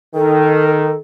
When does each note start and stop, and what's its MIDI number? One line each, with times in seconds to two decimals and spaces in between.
0.15 0.93 51
0.15 0.96 69